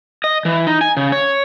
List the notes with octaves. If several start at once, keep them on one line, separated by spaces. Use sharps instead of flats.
D#5
E3
D#4
G#5
C#3
C#5